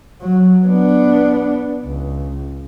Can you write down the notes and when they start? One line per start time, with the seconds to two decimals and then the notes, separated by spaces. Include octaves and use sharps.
0.21 F#3
0.66 B3 D4
1.84 C#2